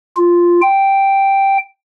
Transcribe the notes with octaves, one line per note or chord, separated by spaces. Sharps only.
F4
G5